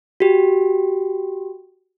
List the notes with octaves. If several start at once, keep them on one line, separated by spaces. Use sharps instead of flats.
F#4 G4